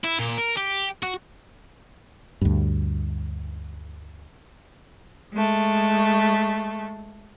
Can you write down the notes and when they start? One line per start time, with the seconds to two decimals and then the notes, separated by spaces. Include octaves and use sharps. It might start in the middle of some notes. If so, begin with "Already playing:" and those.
0.04 E4
0.19 A#2
0.38 A#4
0.57 G4
1.03 F#4
2.41 D2 G2
5.34 G#3 A3